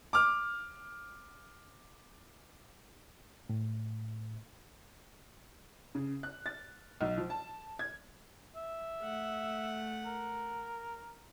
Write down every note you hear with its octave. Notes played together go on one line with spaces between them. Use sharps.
D6 F6
A2
C#3
F#6
A6
B1
F3
A5
G#6
E5
A3 F#5
A#4